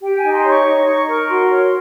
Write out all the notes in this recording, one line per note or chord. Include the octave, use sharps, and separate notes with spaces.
G4 G5
D#4 G#5
C6
C#5
C#6
D#4
D#4
A#4
F#4 C6
C#5